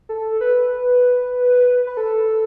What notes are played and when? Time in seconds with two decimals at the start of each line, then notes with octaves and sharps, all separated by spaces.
0.09 A4
0.41 B4
1.87 B4
1.97 A4